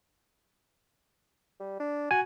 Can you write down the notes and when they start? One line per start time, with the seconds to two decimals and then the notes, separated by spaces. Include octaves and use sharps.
1.60 G3
1.80 D4
2.11 F#4 G#5